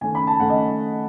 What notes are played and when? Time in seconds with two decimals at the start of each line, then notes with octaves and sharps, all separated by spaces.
0.01 D#3 A3 C#4 G#5
0.15 B5
0.27 A5
0.40 D#3 A3 C#4 F#5
0.50 D#5